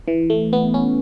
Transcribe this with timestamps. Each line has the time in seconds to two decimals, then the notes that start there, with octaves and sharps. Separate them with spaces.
0.08 E3
0.30 A3
0.53 B3
0.74 C#4